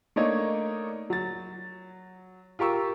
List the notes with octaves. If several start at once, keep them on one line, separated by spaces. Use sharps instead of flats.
A3 A#3 D4 D#4 C#5 D#5
F#3 A6
F4 G4 A#4 C#6 E6